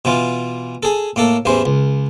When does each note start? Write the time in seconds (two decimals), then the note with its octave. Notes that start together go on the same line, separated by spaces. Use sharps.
0.05 B2 E3 F4
0.83 G#4 A4
1.16 A2 A#3 A4
1.45 A1 E2 E3 C5
1.66 C#2